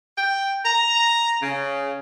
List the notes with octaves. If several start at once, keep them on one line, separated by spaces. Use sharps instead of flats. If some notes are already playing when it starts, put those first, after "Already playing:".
G5
A#5
C#3